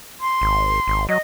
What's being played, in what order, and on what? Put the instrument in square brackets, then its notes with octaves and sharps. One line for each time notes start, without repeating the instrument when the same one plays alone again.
[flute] C6
[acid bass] G#1
G#1
[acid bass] F#3 [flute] D#5